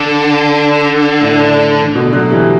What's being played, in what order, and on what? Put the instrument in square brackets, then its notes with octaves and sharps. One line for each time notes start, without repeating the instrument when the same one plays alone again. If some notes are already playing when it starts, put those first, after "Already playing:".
Already playing: [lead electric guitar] D3
[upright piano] A2
B2 D3
D3 F#3
E3 G3